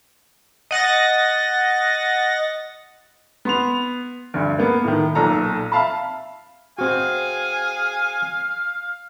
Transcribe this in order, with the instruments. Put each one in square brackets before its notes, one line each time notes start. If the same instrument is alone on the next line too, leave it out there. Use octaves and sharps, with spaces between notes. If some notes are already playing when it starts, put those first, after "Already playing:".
[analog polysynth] D#5 F#5 A6 A#6
[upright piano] B3 C6 F7
D2 G2
A#3 B3
A2 D#3
B1 A#2 A4 A#5
E5 F5 A5 B5
[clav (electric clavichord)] C4 F#4 [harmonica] G#4 G#5 [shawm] F5